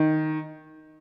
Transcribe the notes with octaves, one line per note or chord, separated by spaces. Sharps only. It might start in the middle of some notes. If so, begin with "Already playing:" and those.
Already playing: D#3